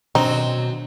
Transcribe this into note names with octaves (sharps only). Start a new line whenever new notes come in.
B2 D#3 F#3 C4 D4 D#4